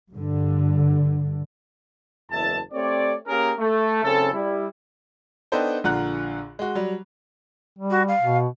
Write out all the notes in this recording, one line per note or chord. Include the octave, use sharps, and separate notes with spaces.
G2 D3
F#1 E2 G#3 E5 A5
A3 C4 G4 C#5 D5
A#3 C#4 G4 G#4 A#4
A3
F#1 C#3 C4 C#4 A4
G3 E4
B3 D4 D#4 A4 C5 G5
A#1 D3 F4 F#5 A#5 F#6
G#3 F#4
F#3 G3
G3
F#4
F5
B2